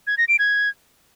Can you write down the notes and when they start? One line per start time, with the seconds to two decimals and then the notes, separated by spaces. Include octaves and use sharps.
0.07 G#6
0.18 A#6
0.28 D7
0.39 G#6